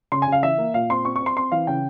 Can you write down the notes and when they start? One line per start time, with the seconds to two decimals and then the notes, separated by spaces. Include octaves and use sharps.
0.12 C#3 C6
0.22 G#5
0.27 C#3 F5
0.43 E3 E5
0.58 A#3
0.74 A#2 F5
0.90 C4 C6
1.05 C4 C#6
1.16 C#6
1.21 C4
1.26 C6
1.36 C4 C6
1.52 E3 F5
1.67 C#3 G5